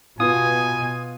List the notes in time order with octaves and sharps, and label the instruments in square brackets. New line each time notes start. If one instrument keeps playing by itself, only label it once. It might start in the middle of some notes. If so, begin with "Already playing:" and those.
[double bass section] B2 [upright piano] B3 F4 [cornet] G#5 [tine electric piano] D#6